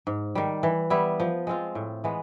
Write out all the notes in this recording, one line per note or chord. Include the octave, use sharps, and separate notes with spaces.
G#2
D#3 G3
E3
G3 B3 E4
F3
G#3 C4 F4
A2
E3 G#3 B3